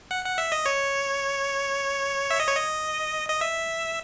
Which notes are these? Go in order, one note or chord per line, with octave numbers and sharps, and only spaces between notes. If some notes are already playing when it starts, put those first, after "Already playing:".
F#5
F#5
E5
D#5
C#5
E5
D#5
C#5
D#5
D#5
E5